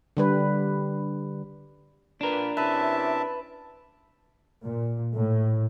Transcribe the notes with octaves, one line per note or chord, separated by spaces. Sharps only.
D3 G3 B4
A#2 D4 A#4 B4
C3 C#4 E4 B4 E5 A5
A#2
A2